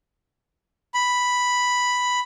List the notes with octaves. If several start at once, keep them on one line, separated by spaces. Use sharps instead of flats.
B5